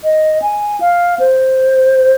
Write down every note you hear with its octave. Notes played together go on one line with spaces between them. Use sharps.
D#5
G#5
F5
C5